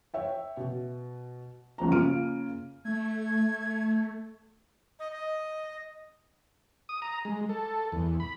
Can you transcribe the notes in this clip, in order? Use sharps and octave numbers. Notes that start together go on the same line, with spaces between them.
C#5 E5 G5
B2
G1 C#2 F3 A#5
C#3 A#3 F4 F6 D7 D#7
A3 G#6
D#5
D#5
D#6
A#5
G#3
A4
E2
B5